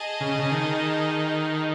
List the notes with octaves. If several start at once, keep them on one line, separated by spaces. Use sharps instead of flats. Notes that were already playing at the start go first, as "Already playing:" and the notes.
Already playing: G#4 D#5 A5
C#3
C#3
D#3